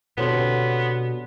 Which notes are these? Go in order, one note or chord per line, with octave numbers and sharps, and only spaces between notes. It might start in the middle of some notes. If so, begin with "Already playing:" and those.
B2 D3 G3 B3 C4 A4 C#5 C6